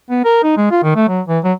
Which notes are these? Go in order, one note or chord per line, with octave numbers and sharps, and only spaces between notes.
B3
A#4
D#4
G#3
F4
D#3
A3
F#3
E3
F#3